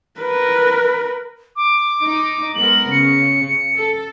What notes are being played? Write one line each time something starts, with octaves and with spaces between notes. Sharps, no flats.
A#4 B4
D6
D#4
G#3 B3 A#4 F#7
C#3 C#7
A4